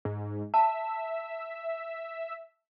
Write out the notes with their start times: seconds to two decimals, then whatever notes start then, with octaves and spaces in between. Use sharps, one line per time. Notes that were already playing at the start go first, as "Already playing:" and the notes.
0.05 G#2
0.54 E5 A5